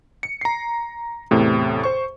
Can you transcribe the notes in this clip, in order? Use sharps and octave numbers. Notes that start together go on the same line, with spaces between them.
C#7
A#5 C7
E2 A2 C3
C5 C#6